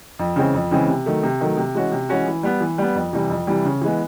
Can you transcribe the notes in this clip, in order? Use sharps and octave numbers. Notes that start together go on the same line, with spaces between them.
F2
C#3 E3 G#3 C4
F2
C#3 E3 G#3 C4
C3
D#3 F#3 A3
C3
D#3 F#3 A3
C3
E3 G#3 C#4 F#4
C3
E3 G#3 C#4 F#4
E3
G3 B3
E3
G3 B3
F2
C3 E3 G3
F2
C3 E3 G3
C#3
E3 G#3 B3